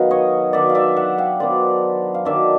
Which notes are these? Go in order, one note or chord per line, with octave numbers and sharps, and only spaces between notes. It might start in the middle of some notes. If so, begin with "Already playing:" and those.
Already playing: D#3 F#3 B3 F5
C#5 D#5
D#3 F#3 B3 D4 D5 E5
F5
D5 E5
E5 F#5
F5 G5
D#3 F#3 B3 D4 C5 D5
F5
D#3 F#3 B3 D4 D5 E5